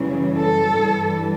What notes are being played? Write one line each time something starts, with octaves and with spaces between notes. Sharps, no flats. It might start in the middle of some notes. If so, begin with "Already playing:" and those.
Already playing: F#2 C#3 E3 G3
A4
G2 E3 G3